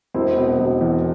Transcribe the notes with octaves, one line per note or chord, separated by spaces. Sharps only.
E1 C4 E4
B2
E1
E2